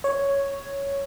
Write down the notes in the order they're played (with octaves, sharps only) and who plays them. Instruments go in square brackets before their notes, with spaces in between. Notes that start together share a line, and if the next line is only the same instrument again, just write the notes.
[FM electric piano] C#5